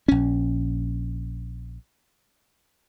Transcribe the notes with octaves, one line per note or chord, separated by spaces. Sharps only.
A#1 C#4